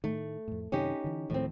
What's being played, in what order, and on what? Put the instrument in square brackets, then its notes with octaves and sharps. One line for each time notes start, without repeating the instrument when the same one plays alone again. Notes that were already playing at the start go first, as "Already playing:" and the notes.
[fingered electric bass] A2 D#3 [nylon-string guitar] A3
[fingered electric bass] F2 A2
[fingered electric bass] F#2 C3 D#3 [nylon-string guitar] C#4 D#4 G4
[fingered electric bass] D3 E3
[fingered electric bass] D1 D#3 F3 [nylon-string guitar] A2 C4